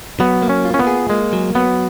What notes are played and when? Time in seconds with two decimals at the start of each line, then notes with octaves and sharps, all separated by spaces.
0.20 F#3 B3
0.42 A#3
0.49 C#4
0.65 F4
0.74 C#4
0.79 B3
0.87 G#4
1.10 G#3 A#3
1.33 F#3
1.55 F#3 B3